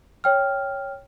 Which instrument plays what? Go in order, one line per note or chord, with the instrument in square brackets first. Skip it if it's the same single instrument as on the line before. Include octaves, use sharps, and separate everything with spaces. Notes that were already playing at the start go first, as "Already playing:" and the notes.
[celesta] C#5 G5 F6